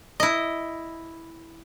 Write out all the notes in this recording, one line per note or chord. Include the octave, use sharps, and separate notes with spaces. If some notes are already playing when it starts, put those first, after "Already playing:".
E4 D#5